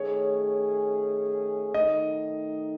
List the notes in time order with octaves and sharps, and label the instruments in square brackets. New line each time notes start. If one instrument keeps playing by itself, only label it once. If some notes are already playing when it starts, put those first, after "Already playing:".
Already playing: [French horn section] D#3 A3 C#4 G#4 [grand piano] C#5
[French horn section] D#3 A3 D#4 [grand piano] D#5